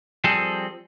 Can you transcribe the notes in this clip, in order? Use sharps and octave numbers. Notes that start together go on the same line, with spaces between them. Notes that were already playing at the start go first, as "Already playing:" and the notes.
F3 G3 C4 G#4 A4